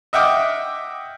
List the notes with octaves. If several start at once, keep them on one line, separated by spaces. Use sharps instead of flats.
D#5 E5 F#5 G5 D6 F6